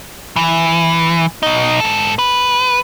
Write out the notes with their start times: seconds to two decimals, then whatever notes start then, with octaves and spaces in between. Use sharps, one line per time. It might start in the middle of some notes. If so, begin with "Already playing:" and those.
0.36 E3
1.43 B2 D#4
1.80 G#2 A4
2.19 B4